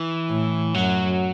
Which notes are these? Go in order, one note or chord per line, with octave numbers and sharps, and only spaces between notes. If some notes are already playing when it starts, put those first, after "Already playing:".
Already playing: E3
A2
F#2 F#3